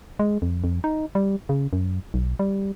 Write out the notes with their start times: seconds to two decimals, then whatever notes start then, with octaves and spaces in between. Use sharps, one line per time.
0.19 G#3
0.42 F2
0.64 F2
0.84 D#4
1.15 G3
1.49 C#3
1.73 F#2
2.14 B1
2.39 G3